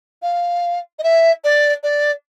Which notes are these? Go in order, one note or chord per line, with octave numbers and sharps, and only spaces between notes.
F5
D#5
E5
D5
D5